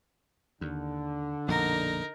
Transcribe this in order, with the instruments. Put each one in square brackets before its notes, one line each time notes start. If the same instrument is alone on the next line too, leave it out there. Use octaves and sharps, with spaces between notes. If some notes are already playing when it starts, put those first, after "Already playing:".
[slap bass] D#2 [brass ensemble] D3
[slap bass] A#1 F2 B2 [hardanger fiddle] D#4 A#4